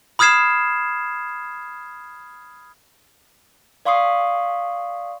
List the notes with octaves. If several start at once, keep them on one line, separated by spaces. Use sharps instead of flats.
B5 D#6 F6 G#6 C7 E7
D5 F5 C6 C#6 D#6 C7